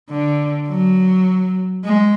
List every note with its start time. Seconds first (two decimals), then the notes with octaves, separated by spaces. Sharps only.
0.10 D3
0.68 F#3
1.85 G#3